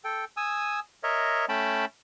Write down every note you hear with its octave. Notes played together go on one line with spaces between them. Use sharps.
A4 G5
G#5 D#6 E6
A#4 C#5 D#5 E5
A3 C#4 G5 A5 B5